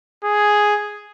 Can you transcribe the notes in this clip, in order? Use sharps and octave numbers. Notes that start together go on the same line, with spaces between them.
G#4